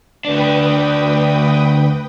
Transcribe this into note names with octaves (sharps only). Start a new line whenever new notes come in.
D2 D4 B4 G5 D#6